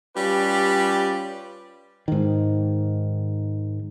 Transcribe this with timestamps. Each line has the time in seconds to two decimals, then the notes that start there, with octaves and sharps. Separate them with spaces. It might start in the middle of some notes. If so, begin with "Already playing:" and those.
0.17 G3 C#4 F4 G4 B4 D5
2.08 G#2 D#3